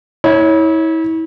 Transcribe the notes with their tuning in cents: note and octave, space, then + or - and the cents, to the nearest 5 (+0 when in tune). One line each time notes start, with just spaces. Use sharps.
E4 -35 C#5 +0